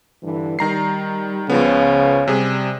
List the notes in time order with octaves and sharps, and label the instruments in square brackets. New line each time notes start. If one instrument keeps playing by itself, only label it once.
[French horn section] G2 D3 E3
[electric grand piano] D#3 A#5 C7 [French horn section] G3
[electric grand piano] C#2 F3 B3 [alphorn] C#3
[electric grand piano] C3 G#4 [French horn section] G3